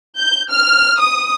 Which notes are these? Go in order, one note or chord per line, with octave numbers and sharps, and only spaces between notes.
G6
F6
D#6